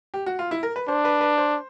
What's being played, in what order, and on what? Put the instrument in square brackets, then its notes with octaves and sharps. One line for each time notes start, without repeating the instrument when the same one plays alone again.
[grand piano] G4
F#4
F4
E4
A#4
B4
[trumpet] D4 [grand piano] C5
[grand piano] B4
B4
C5